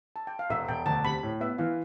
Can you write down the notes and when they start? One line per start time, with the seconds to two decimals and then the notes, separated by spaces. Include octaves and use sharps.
0.16 A5
0.27 G5
0.39 F5
0.50 E1 E5
0.68 E1 G5
0.86 D2 A5
1.05 C3 B5
1.23 A2
1.40 B3 E5
1.58 E3 F5